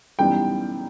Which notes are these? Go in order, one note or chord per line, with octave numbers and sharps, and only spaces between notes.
F#2 E3 G3 B3 D#4 G5